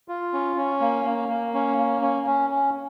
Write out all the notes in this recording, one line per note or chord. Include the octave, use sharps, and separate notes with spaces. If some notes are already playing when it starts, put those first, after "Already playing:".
F4
C#4
C#4
A#3
A#3
A#3
C#4
A#3
C#4
C#4
C#4